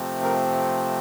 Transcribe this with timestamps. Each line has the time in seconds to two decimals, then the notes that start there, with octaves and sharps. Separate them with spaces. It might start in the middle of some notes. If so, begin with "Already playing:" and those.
Already playing: C3 F3 A3 C4
0.23 A#4